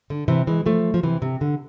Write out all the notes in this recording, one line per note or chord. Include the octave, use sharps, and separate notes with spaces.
D3
C3 E3
E3 G#3
F3 A3
F3
C3 E3
C3
D3